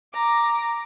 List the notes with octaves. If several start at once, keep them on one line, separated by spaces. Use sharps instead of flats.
A#5 D6